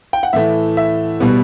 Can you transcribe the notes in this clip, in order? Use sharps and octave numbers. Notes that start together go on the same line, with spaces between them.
G5
F#5
A2 E3 A3 E5
E5
B2 G3 B3